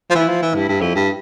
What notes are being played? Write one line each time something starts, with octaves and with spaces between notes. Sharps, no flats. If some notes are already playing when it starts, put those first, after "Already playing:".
F3
E3 E4
F3
E3
G2 E4
G2
F2
G2